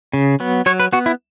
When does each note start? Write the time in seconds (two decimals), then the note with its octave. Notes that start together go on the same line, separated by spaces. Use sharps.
0.13 C#3
0.40 F#3 B3
0.66 F#3 C#5
0.80 B4
0.93 B3 F#4
1.06 E4